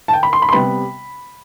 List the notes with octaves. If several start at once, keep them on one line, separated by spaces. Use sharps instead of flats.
A5
G5
B5
C6
B5
C6
C3 G3 B3 B5